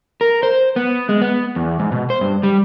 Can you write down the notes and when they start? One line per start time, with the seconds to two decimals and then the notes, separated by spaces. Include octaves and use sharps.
0.21 A#4
0.43 C5
0.76 B3
1.09 G#3
1.22 B3
1.56 E2
1.79 G#2
1.92 B2
2.10 C5
2.21 G2
2.43 G3